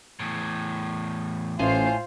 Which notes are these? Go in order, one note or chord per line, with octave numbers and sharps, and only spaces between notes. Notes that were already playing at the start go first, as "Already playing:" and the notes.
E2 A2
A1 A2 F4 C5 G#5